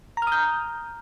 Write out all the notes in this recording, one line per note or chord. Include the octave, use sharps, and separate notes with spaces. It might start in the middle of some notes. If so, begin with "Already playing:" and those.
A#5 D#6 F6 G6